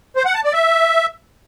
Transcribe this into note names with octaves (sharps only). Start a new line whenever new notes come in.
C5
F#5
A5
D5
E5